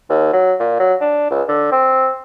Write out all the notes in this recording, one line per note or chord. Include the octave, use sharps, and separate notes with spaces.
D#2
F#3
A#2
F#3
D4
C#2
D3
C4